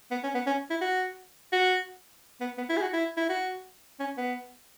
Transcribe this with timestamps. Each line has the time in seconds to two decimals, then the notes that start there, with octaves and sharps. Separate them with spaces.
0.11 B3
0.23 C#4
0.34 B3
0.46 C#4
0.70 E4
0.81 F#4
1.52 F#4
2.40 B3
2.58 B3
2.69 E4
2.77 G#4
2.82 F#4
2.93 E4
3.17 E4
3.29 F#4
3.99 C#4
4.17 B3